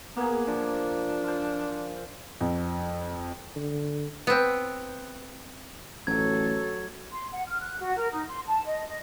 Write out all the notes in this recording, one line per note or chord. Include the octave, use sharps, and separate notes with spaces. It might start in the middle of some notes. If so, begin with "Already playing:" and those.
A#3 B3 G#4
F3 D4
F4 C5
F2
D3
B3 C4
A1 F#3 A4 G#6
C6
F#5
F6
F#6
F#4
A#4
D#4
C6
A5
D#5
D#5